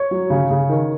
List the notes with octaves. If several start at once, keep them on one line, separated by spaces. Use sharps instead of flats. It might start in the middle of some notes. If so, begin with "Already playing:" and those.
Already playing: C#5
F#3
C#3
C#3
D#3